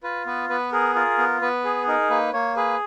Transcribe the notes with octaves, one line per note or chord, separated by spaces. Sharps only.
F4 B4
B3 B4
B3 B4
G#4 A#4
F4 A#4
B3
B3 B4
G#4
D#4 A#4
A#3 B4
A#3 C#5
G#4 B4